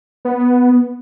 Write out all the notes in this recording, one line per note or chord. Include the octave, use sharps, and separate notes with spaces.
B3